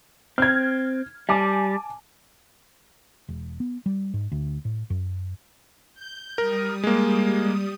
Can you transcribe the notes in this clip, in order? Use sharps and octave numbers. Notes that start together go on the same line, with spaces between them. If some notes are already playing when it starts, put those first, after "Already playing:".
C4 F6 G#6
G3 G#5 A5 D6
E1
B3
G3
G#2
D2
A2
F#2
G6
G3 A#4 D#6
G#3 A#3